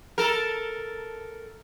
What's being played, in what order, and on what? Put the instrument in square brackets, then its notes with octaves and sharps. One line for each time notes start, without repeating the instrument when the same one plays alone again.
[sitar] A4 A#4